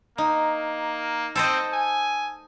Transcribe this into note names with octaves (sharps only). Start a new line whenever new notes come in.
A#3 D#4
C4 A4 C5 D#5
G#5